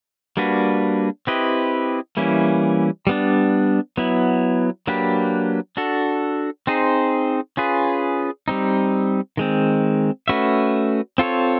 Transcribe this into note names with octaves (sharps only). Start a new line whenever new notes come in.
G3 A#3 D4 F#4 B4
C4 E4 G4 B4 D#5
E3 G3 A#3 C#4 E4
G3 B3 D4
F#3 B3 E4
F#3 A#3 D4 G4 B4
D4 F#4 A4
C4 D#4 G#4 C5
C#4 F4 G#4 B4
G3 C4 D#4
D#3 G#3 C4
A3 C#4 F#4 B4 E5
C4 F4 A4 C#5